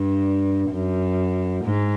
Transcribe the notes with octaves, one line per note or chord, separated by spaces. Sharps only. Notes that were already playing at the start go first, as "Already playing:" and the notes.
Already playing: G2
F#2
G#2